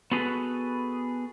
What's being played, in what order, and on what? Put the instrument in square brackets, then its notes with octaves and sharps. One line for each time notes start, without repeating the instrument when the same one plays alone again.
[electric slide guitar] B3 F#4 G#4 A4 B4